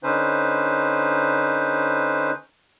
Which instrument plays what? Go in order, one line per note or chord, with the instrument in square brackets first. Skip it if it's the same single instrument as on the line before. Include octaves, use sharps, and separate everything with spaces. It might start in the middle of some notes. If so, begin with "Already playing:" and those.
[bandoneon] D3 C#4 D#4 B4 C5